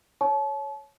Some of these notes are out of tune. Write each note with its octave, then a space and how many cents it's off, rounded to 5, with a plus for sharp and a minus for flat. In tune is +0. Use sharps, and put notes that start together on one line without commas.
C#5 +0 A5 -35 C#6 +0